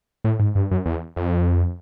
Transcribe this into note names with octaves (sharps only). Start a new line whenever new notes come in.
A2
G#2
G2
F#2
E2
F2